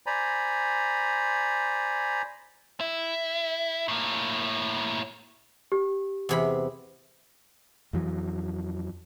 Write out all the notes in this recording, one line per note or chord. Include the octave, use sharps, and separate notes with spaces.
C5 D5 G#5 A#5 B5
E4
A2 A#3
G4
E2 C3 B5
F2 E3 F#3